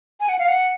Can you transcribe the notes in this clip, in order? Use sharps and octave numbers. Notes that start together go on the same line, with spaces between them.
G#5
F#5
F5
F#5